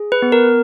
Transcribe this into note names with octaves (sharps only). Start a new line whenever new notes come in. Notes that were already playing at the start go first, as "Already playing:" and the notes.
Already playing: G#4
B4
B3
A#4